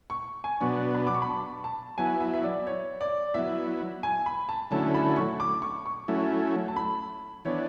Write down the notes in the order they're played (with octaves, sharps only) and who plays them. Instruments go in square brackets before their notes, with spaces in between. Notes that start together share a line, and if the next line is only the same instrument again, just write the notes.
[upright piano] C#6
G#5
[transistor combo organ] B2 F#3 B3 D4 [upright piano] C#6
[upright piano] B5
D6
C#6
B5
A5
A5
[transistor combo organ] F#3 B3 E4 [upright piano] G#5
[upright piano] E5
E5
D5
C#5
D5
[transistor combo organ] F#3 B3 E4 [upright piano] E5
[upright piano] G#5
B5
A5
[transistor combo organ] D3 F#3 A3 C#4 E4 [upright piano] A5
[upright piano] B5
C#6
D6
C#6
C#6
[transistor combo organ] F#3 A3 C#4 E4
[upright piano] A5
B5
[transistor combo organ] E3 B3 D4 [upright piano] C#5